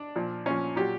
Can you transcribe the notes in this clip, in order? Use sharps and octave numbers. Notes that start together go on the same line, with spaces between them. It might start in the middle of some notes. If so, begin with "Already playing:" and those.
Already playing: D4
A#2 F3
A#2 F3 C#4
A#2 F#3 G4